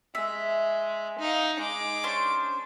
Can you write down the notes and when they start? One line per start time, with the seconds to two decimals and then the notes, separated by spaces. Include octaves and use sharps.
0.15 G#3 E5
1.19 D#4 F5
1.59 G#3 D6
2.04 C#4 D4 C5